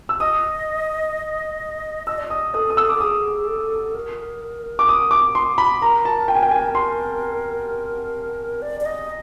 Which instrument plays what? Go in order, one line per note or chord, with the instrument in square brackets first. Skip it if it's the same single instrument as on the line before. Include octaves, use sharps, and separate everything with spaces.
[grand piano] E6
[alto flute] D#5 [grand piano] D#6
[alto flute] D#5 [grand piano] E6
[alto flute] D5
[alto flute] D#5 [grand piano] D#6
[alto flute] A4 [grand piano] D#6
[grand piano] D#6
E6
D6
[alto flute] A4
[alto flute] G#4 [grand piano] D#6
[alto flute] A4
A#4
[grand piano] D6
D#6
D6
C6
B5
[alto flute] A#4 [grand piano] A#5
[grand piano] A5
G5
G#5
G5
G#5
C6
[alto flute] D5
D5
D#5